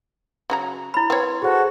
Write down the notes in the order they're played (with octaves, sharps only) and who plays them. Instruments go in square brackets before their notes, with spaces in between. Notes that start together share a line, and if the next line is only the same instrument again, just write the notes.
[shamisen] C#3 F#3 A#5
[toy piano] E4 B5
[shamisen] C4 C#5 [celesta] B4
[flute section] F#4 A4 [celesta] G#4 C5